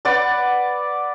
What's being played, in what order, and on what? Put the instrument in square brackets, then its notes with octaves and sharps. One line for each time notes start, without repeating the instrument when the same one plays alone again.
[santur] B4 D5 F#5